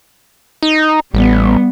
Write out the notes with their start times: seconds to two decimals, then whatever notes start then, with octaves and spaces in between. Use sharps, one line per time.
0.63 D#4
1.14 A1 G3 B3